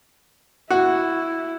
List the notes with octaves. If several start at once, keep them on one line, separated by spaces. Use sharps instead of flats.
E4 F#4